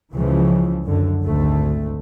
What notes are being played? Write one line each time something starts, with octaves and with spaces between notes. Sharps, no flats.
C#2 C#3 E3 F3
F#2 D3
G#1 D2 A3